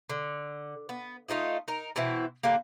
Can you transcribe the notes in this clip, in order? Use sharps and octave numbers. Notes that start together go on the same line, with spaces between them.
D3
B3
A3 D#4 F4 D#5
D#4 A#4
B2 E3 C4 E4
A2 D3 G3 A#3